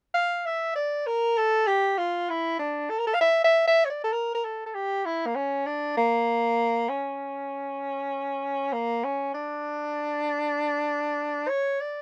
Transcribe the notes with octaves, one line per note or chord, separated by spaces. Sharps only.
F5
E5
D5
A#4
A4
G4
F4
E4
D4
A4
A#4
A4
F5
E5
E5
E5
C#5
D5
A4
A#4
A#4
A4
A4
G4
E4
A#3
C#4
D4
A#3
C#4
A#3
C#4
D4
C#5
D5